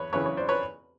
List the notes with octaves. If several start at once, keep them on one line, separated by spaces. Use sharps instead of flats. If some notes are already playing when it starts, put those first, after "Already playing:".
Already playing: E2 B4 C#5
E2 C#3 E3 B4 C#5
C#5
C5 D5
B4 C#5